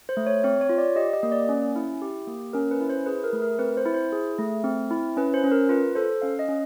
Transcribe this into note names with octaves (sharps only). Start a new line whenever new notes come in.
C5
A3
C#5
C4 C#5
C#5
F4
D5
G4 D#5
D#5
A#3
D5
C#4
E4
G4
A#3
C#4 A#4
B4
E4
C5
G#4 B4
A#4
A3
A#4
C4 B4
C5
E4
C5
G#4
A3
C4
E4
C#4 B4
C5
C#4
A#4
F4 B4
A4 C5
C#4 F5
D#5
C#4